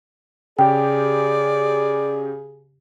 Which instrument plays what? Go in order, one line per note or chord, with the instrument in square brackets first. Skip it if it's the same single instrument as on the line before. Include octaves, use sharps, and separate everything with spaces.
[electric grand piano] C#3 G4 [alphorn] G#4 [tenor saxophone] D5 [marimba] G5